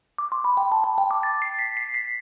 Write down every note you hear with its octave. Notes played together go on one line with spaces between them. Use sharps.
D6
C6
B5
G5
A5
A5
G5
D6
A6
C7
B6
C7
B6